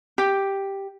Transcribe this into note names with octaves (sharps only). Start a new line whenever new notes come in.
G4